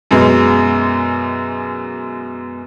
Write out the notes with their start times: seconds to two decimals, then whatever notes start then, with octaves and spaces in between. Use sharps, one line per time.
0.11 F#2 B2 G#3